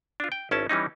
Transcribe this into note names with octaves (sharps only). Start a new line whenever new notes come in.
D4 F4
G5
G#1 C#4 E4 A5
E3 G3 C#4 D#4